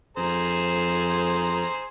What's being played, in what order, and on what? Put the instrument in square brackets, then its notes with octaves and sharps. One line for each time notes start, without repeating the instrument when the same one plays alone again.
[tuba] F2 [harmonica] G#4 C5 A#5